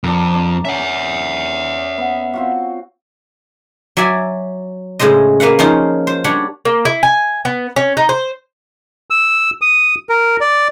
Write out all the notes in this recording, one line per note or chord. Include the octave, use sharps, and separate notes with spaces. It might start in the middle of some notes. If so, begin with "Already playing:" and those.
F2 D4 A#4
D4
C#4 E5 F#5
B3
C4 F4 F#4
F#3 D5 E5 G#5
A2 C#3 G#3 C5 D#5
A#3 B4 F5 F#5
F3 C#4 D#4 F4
C5
G3 D4 C#5 F#5
A#3
E4
G#5
B3
C#4
D#4
C5
E6
D#6
A#4
D5